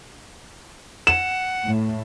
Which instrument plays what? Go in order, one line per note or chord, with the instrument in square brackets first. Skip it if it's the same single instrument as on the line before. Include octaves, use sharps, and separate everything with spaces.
[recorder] F#5 [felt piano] E7
[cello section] A2